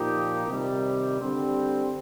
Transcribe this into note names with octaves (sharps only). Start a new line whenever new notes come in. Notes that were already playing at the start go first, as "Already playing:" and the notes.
Already playing: A#2 F3 A#3 D#4 G4
C3 D#3 G3
D3 G3 C4